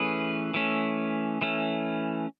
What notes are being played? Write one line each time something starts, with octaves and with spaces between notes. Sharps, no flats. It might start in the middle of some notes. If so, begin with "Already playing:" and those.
Already playing: E3 A3 C#4 G#4 B4
E3 A3 C#4
E3 A3 C#4